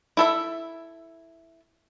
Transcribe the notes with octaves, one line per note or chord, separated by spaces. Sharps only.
E4 A4 E5